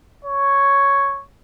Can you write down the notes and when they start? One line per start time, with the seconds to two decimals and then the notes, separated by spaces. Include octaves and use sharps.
0.25 C#5